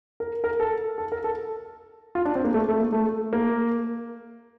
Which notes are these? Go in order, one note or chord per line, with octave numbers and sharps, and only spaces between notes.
A#4
A#4
A4
A4
A#4
A4
F4
D4
C4
A#3
A3
A3
A#3
A3
A#3